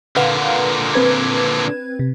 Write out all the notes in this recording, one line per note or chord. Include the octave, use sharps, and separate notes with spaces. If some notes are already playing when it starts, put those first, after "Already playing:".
A#2 D3 B4 F5 F#5
C4 B4 G#6
C3